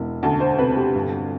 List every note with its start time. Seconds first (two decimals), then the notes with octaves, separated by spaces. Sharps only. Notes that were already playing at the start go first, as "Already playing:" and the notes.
Already playing: E1 E3
0.23 D2 A5
0.40 C5
0.58 C3 B4
0.77 G4
0.95 G1